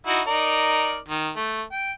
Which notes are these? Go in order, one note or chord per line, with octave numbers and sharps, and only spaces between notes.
D#4 E4 F#4
D#4 A#4 D5
D#3
A3
G5